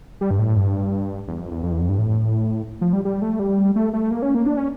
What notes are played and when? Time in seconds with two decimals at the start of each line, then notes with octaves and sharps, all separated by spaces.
0.21 G3
0.31 G2
0.39 A2
0.56 G2
1.28 E2
1.39 F2
1.51 E2
1.63 F2
1.71 E2
1.81 F2
1.89 G2
1.99 A2
2.81 F3
2.93 G3
3.05 G3
3.22 A3
3.39 G3
3.76 A3
3.93 A3
4.11 A#3
4.22 C#4
4.35 A#3
4.46 D4
4.57 C#4